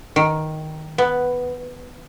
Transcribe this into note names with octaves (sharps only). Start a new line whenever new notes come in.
D#3
B3